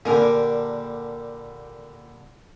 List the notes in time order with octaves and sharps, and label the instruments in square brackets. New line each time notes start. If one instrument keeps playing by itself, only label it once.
[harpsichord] A#2 D3 G3 [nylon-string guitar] A#3 [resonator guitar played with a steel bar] D4 A#4 G#5